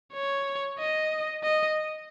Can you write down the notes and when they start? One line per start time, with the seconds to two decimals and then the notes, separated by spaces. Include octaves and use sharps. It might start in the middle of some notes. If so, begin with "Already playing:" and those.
0.13 C#5
0.79 D#5
1.43 D#5